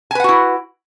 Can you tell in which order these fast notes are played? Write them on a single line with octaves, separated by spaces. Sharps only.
G#5 B4 F#5 F#4 E4